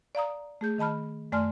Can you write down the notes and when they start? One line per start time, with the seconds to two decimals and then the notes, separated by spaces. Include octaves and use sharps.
0.15 D5 F5 A#5 D#6
0.61 A3 G#4 G6
0.78 D#3 D#5 A5 B5 F6
1.32 F#2 A3 D5 G#5 C6 F6